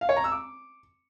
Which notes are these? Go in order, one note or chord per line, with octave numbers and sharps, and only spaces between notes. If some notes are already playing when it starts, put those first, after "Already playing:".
F5
C#5
A#5
E6
D6